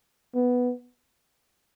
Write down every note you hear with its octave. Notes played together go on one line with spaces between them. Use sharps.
B3